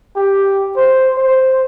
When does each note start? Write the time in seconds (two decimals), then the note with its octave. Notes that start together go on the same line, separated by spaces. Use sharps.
0.16 G4
0.76 C5
1.17 C5